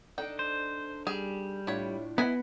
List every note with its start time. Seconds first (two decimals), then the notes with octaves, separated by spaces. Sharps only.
0.18 D4 D#4 A4 G5
0.39 C5
1.07 G3 G#4
1.67 A2 D4 E4 F4 C#5
2.18 B3 E4 D#5 G#5